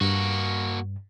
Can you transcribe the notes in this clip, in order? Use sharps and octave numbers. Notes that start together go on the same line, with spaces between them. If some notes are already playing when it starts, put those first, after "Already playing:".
G2 A#3 F#4